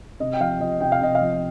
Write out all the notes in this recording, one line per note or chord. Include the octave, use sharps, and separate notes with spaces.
C3 D#5
G5
F3 F5
F3 D#5
C3 G5
F5
C3 D#5
F5
F3